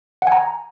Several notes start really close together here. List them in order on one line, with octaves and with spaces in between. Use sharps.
F#5 G#5 A#5